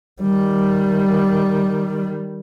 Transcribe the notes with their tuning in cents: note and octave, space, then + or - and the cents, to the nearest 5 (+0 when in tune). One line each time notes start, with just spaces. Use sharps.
D#3 +0 G3 -5